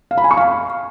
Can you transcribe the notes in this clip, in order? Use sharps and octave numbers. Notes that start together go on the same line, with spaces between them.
F5
B5
G#5
C#6
F5